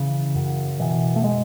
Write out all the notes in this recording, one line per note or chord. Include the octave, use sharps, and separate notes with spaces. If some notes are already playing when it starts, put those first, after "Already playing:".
Already playing: C#3 E3
F#2
B2 E3
A3
G#3